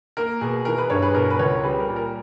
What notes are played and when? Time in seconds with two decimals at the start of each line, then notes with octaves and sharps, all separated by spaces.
0.17 A#3 A#4
0.41 B2 G#4
0.65 E3 A#4
0.78 G#4 B4
0.90 G2 A#4 C#5
1.02 G#4 B4
1.15 B2 A#4
1.30 B4
1.39 C#2 A#4 C#5
1.63 G3 G#4 B4
1.80 A#4
1.88 A#2
1.96 A#4